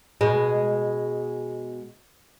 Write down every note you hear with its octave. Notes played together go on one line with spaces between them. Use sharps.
B2 G#3